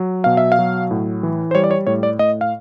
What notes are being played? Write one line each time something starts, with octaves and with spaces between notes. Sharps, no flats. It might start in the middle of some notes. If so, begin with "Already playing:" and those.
Already playing: F#3
B2 F5
E5
F5
F#3
A2
E3
C5
G3 C#5
D5
C#5
A2 C#5
D5
A2 D#5
F5